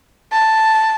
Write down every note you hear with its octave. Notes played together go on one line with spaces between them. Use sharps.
A5